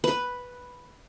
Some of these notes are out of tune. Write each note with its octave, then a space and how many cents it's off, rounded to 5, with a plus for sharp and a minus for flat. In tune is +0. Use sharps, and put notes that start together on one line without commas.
B4 +0